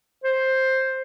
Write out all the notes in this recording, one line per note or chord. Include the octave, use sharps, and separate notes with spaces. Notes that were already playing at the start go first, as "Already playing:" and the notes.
C5